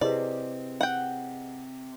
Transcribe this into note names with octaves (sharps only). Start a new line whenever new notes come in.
C3 E4 G4 G#4 B4 C5 D5 D#5
F#5 G5